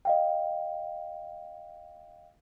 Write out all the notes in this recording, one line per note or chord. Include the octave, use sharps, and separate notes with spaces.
D#5 F5 G5